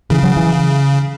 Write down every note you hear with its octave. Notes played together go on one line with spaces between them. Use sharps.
C#3 E3
F#3
E3